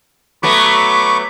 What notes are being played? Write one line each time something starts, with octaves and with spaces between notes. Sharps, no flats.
F#3 A3 B3 B5 C#6 D6